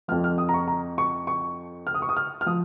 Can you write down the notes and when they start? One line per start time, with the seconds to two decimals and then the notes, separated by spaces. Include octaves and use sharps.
0.08 F3 F6
0.11 F2
0.24 F6
0.38 D#6
0.49 A#5
0.54 C#6
0.68 A#5
0.98 C#6
1.27 C#6
1.87 F6
1.94 D#6
2.02 C#6
2.09 D#6
2.17 F6
2.41 F6
2.46 F3 D#6